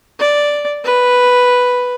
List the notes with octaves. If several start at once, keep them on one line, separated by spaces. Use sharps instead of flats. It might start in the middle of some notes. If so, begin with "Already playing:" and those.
D5
B4